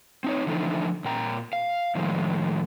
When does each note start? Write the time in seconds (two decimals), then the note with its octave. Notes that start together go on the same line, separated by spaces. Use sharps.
0.24 C4 D#4 C#5
0.47 D3 E3 F3 A3 D#4
1.05 A#2 G5 A#5
1.53 F5
1.95 A2 D#3 F3 G#3